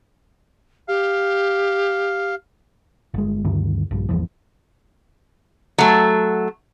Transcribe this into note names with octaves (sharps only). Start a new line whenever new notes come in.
G4 F5
G1 G#3
D2 G2 D#3
A#1 G2
G#1 E2 E3 F3
F#3 A3